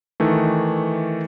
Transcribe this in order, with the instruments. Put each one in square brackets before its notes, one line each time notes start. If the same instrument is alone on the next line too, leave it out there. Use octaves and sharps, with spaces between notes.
[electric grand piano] D#3 E3 A3